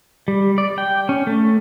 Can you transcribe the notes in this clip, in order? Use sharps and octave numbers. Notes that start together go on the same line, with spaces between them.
G3
D5
G5
C#4
A3